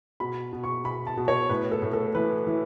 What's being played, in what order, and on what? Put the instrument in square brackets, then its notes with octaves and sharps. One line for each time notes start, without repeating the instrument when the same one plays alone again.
[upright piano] B2 B5
B2
C#6
B2 B5
A5
B2
C#5
A2 B4
A4
A2
A4
E3 B4
E3